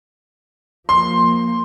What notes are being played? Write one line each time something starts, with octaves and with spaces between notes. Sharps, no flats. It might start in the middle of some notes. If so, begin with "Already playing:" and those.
F3 A#3 C6